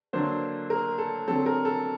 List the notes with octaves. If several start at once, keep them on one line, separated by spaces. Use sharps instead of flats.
D3 F#3 A#3 D4 C5
A#4
A4
D3 F#3 C4 A4
A#4
A4